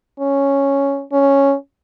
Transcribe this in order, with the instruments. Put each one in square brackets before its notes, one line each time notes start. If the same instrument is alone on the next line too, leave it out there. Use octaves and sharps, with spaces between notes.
[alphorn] C#4
C#4